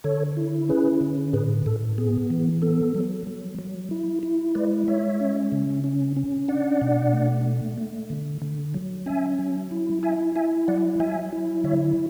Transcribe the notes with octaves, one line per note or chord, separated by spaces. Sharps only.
D3 A4 C#5
E4
C#4 G#4 B4
D3
A2 G#4 B4
A2 A4
B3 G#4
E3
B3 A4
F#3
F#3
F#3
E4
E4
G#3 B4 D5
G#3 C#5 E5
C#4
C#3
C#4
C#4
D4 D5 F#5
B2
A3
A3
A3
D3
D3
F#3
C#4 E5 G#5
F#3
E4
E4 E5 G#5
E4 E5 G#5
F#3 D5 F#5
F#3 E5 G#5
E4
D3 C#5 E5